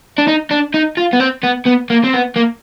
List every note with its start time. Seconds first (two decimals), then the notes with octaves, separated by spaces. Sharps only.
0.18 D4
0.28 D#4
0.51 D4
0.74 D#4
0.97 F4
1.13 B3
1.20 C4
1.44 B3
1.66 B3
1.90 A#3
2.04 C4
2.14 B3
2.36 A#3